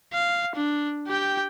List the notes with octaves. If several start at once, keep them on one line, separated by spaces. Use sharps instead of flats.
F5
D4
G4 G5